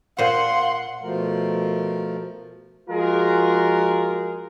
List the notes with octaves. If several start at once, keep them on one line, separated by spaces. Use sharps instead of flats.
A#2 C5 F5 F#5 C6
B2 F3 A3 A#4
F3 G#3 F4 F#4 G#4 A#4